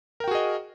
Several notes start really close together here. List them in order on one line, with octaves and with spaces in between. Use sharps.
A#4 G5 F#4 G#4 D#5